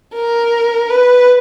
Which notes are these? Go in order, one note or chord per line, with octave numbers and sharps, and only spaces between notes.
A#4
B4